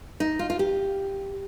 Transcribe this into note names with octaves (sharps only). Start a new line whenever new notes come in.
D#4
F4
F4
G4